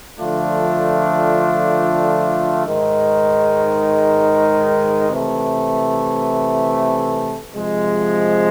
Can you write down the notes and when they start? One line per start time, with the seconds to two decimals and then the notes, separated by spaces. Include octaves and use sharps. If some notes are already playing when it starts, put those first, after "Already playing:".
0.19 D3 F3 A3 D4 F4
2.65 G#2 D#3 G#3
5.09 C3 E3 A3
7.54 C3 F3 G#3